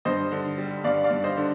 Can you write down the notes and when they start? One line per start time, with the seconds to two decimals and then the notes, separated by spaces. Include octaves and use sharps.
0.05 G2 C5 D#5
0.32 D3
0.58 G3
0.84 G2 D5 F5
1.04 D5 F5
1.11 G2
1.24 C5 D#5
1.37 D3